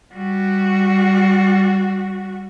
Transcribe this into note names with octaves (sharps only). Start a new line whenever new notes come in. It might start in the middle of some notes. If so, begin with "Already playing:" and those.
G3 F#4